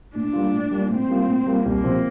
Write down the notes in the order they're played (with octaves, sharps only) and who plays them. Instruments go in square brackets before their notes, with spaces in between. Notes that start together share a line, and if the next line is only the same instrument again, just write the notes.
[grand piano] A2 [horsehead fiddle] D4
[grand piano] G3 A#3 F4
A2
G3 A#3 F4
[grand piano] A2 [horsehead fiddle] C4
[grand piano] G3 A#3 F4
A2
G3 A#3 F4
[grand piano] C2 [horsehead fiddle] A#3
[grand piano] C3 F3 C4